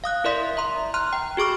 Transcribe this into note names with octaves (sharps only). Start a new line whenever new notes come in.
F5 D#6 F#6
E4 A#4 D5 E5 C6 B6
E5 A#5 C6
A#5 C6 F6 F#6
G5
F#4 G#4 C#6 D6 F6